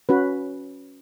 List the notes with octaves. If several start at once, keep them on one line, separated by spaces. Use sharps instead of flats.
C#4 F#4 B4